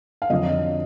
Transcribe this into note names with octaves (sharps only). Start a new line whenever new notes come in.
F5
F2 D3 F#3 D#5